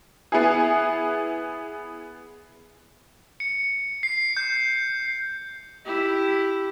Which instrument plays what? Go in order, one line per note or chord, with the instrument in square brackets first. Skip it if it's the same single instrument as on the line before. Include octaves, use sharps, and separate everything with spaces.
[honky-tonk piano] B3 E4 G#4
[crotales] C#7
C7
G6
[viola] E4 G4